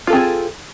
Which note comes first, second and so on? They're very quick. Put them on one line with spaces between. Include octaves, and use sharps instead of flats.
F4 A4 C4 G#4